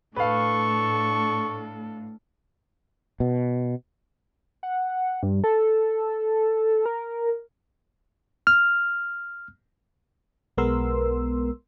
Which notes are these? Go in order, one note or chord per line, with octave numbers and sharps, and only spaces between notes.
A2 D4 A4 B4 F5 C#6
B2
F#5
G2
A4
A#4
F6
B1 G#3 B3 A#4 C6 E6